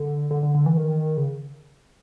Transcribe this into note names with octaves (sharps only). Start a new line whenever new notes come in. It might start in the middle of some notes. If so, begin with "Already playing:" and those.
Already playing: D3
D3
D3
D3
E3
D#3
C#3